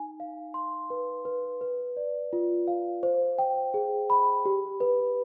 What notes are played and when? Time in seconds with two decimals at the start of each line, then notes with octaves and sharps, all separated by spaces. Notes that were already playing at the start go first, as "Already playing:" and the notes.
Already playing: D#4 G#5
0.20 F5
0.54 C6
0.90 B4
1.25 B4
1.61 B4
1.97 D5
2.33 F4
2.68 F5
3.03 C5
3.38 G5
3.74 G#4
4.10 B5
4.45 G4
4.80 B4